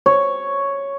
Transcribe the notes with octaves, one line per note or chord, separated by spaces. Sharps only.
C#5